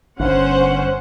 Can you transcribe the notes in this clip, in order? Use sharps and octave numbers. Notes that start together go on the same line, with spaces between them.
G1 G2 C#4 C5 F#5